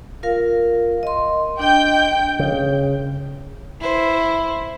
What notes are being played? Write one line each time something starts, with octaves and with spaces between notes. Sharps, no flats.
F4 A#4 F5
D#5 C6
D4 D#5 G5 G6
C#3
E4 C5